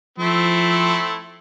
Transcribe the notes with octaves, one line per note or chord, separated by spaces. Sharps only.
F3 A3 C4 E4